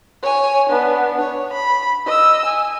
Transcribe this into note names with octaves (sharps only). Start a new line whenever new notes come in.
C#5 G#5
B3 D4
C#5
B5
D#5 E6
G#5